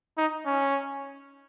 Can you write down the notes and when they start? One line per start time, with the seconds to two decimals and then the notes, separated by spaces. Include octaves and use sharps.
0.18 D#4
0.46 C#4